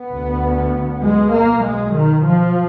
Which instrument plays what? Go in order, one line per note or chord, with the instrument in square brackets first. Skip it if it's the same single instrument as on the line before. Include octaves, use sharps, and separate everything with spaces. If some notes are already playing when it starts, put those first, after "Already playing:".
Already playing: [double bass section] B3
D2
G#3
B1 B2 A#3
G#3
D#3
F3